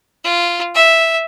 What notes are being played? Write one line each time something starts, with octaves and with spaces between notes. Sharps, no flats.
F4
E5